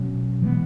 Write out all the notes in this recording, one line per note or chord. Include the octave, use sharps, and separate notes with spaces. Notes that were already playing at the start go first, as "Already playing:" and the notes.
Already playing: B2 F#3 C#4
E3 G#3 B3